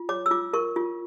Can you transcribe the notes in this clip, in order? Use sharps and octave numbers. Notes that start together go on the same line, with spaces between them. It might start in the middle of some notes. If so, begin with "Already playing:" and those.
Already playing: F4
C#5 D6
E6
F4 D6
A#4 C#6
F4